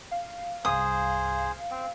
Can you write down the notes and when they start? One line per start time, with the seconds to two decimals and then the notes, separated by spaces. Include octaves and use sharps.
0.11 F5
0.65 C2 G2 G#4 C5 D#6
1.71 C4